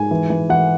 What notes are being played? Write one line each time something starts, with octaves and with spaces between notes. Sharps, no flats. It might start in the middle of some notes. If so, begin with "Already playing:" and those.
Already playing: G#2 G#5
E3
E3
E3 F#5